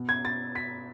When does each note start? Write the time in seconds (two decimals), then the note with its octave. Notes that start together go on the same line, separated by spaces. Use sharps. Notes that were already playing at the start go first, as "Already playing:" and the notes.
Already playing: B2
0.09 G#6
0.25 A6
0.55 B6